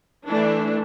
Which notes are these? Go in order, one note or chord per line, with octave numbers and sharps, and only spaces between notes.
E3 A3 D4